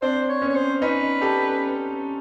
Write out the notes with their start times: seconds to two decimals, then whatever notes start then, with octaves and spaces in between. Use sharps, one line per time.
0.02 C4 D4 C5
0.29 C#5
0.42 B3 C#4
0.49 C#5
0.55 C5
0.81 C#4 D#4 B4
1.21 G4 A4